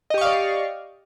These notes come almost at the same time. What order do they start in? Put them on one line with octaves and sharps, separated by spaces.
D#5 G4 C#6 F5 D5